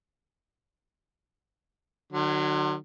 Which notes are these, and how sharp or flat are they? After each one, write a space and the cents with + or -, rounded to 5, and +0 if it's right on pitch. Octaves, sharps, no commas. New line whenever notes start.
D3 +45 F#3 +0